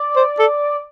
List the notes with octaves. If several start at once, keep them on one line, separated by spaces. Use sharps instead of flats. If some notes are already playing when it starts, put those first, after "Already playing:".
Already playing: D5
C5
A4